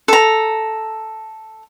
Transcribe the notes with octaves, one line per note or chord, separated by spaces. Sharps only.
A4 A#5